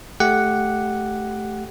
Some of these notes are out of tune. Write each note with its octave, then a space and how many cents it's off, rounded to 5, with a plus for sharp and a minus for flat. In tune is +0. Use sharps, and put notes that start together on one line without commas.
A3 -15 G4 +0 F#5 +0